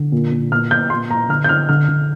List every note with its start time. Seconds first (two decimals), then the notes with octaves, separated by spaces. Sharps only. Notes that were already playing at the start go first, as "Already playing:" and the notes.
Already playing: D3
0.12 A#2
0.32 A#2
0.52 A#2 F6
0.71 A#2 G6
0.90 A#2 C6
1.09 A#2 A#5
1.29 D3 F6
1.44 G6
1.48 D3 F6
1.69 D3 F6
1.89 D3